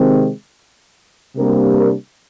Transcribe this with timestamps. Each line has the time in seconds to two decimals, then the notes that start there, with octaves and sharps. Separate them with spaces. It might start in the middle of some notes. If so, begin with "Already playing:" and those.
Already playing: C3 D#3 G#3 C4
1.36 C3 G3 A#3 D4 A#4
1.77 A#4